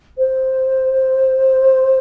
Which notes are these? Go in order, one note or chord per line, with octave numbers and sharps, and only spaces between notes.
C5